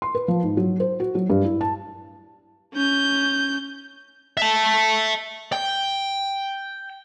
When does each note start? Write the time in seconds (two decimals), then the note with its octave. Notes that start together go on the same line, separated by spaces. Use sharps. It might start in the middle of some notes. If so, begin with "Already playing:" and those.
0.02 C6
0.15 B4
0.28 F3
0.43 G#2
0.57 F#3
0.80 C5
1.00 F#4
1.15 F#3
1.30 G2
1.44 E4
1.61 A5
2.74 C#4 G6
4.37 E5 A5
5.53 G5